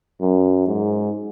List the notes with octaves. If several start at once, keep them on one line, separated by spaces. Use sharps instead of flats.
F#2
G#2